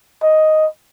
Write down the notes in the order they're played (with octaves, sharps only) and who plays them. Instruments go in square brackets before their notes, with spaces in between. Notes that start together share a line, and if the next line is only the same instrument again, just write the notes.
[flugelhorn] D#5